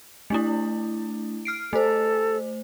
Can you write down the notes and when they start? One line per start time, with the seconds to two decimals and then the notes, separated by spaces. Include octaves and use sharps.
0.30 A3 D4 E4
1.45 F6 C7 D7
1.73 A3 A4 C5